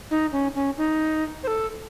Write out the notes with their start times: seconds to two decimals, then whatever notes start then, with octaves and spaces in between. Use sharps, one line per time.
0.11 D#4
0.32 C#4
0.55 C#4
0.77 D#4
1.43 C5
1.47 A4